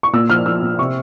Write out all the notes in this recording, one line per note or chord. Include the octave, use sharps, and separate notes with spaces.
C#6
A#2 E6
F3 F6
F3 E6
A#2
C3 C#6